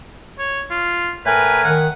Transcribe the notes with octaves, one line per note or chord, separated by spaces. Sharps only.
C#5
F4
A2 A#4 B4 G#5
D#3 F#5